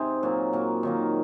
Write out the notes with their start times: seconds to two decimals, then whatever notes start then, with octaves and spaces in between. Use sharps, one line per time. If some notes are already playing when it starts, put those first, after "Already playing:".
Already playing: C3 C4 D#4 G#4
0.23 A#2 F#3 A#3
0.53 A#2 F#3 A#3
0.83 D#3 F#3 A#3